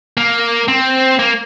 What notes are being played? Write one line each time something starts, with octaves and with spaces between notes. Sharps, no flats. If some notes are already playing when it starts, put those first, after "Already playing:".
A#3
C4
A#3